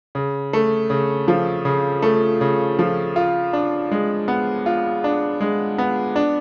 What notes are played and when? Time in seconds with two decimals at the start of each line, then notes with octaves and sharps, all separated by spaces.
0.15 C#3
0.53 A3
0.90 C#3
1.28 F3
1.65 C#3
2.02 A3
2.41 C#3
2.79 F3
3.16 F4
3.53 D4
3.91 G#3
4.28 B3
4.66 F4
5.04 D4
5.40 G#3
5.78 B3
6.16 D4